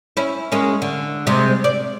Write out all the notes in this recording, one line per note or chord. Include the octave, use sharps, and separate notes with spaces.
C#4 E4
G#3 A#3 C#4
D3
C3 G3 G#3
D5